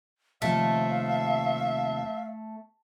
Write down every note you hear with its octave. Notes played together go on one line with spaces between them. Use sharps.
D#2 C3 F3 A3 E5 F5